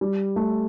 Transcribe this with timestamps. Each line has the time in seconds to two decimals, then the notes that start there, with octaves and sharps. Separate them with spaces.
0.01 G3
0.36 A3